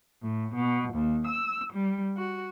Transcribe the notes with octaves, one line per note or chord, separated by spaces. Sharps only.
A2
B2
D#2
E6
G3
F#4